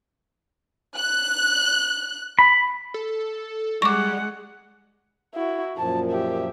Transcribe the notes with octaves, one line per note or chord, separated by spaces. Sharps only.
F#6
B5
A4
G3 G#3 F#5 C#6 D6
E4 F#4
F#2 A#2 F3 A5
G4 E5